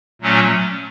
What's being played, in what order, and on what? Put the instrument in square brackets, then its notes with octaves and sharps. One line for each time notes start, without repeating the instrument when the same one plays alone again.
[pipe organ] A#2 F#3 A3 C#4